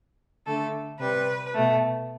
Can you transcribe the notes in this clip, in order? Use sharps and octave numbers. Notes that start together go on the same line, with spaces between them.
D3 A3 A4
C3 G3 B4
B2 A3